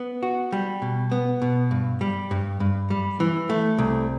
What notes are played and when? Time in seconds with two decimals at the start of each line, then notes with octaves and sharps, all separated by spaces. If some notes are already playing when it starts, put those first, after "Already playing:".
Already playing: B3
0.23 F#4
0.52 G3
0.82 B2
1.12 B3
1.42 B2
1.71 G2
2.01 G3
2.31 G2
2.60 G2
2.90 G3
3.20 E3
3.50 A3
3.78 C2